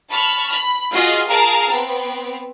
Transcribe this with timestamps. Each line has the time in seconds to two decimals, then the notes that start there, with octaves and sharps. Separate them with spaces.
0.10 A5 B5 C#6 F6
0.50 B5
0.94 F4 F#4 G#4 D#5 F5
1.27 G#4 A#4 F5 A5 A#5
1.71 B3 C4